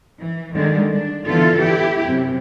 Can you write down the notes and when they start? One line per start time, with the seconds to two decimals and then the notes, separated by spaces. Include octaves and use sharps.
0.19 E3
0.55 D3 D#3 G3 G#3 A#3
0.90 D4
1.27 D3 E3 B3 E4 F4 A4
1.58 E4 G4
2.04 F#2 C3